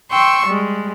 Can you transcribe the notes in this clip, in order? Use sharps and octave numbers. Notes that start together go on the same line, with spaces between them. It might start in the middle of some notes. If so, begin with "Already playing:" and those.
G5 C6 C#6 E6
G3 G#3